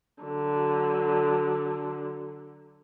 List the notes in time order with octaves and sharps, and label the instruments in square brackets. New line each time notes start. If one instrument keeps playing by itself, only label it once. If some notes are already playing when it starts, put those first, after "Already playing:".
[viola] D3 F#3